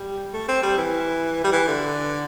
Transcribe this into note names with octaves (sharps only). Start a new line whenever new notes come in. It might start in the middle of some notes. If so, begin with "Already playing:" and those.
Already playing: G3
A3
C4
G3
E3
G3
E3
D3